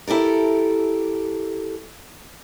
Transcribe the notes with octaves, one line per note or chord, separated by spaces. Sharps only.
E4 G4 A4 A#4